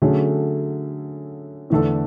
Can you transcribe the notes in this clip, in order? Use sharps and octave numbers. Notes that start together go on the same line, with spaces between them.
D3 F#3 A3 C#4 G#4
E2 D3 A3 D4 A4